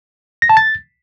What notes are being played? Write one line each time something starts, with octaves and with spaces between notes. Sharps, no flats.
A#6
A5
A6